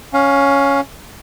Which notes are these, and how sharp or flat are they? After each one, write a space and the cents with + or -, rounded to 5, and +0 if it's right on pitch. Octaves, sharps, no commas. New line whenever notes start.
C#4 +0 F5 +15